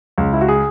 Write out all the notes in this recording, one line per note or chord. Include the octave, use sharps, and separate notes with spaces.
C#2
E4
F#4
G#4